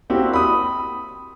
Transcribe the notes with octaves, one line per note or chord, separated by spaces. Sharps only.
A#3 C4 E4 F#4 G4
B5 D#6